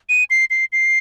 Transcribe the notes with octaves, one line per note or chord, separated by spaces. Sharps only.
D#7
C7
C7
C7